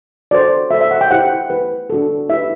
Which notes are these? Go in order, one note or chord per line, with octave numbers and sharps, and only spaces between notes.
D4 F#4 A4 C5 D5
F#4 A4 C5 E5
E5
F#5
G5
E4 G4 C5 F#5
E4 G4 B4
D4 F#4 A4
E4 G4 B4 E5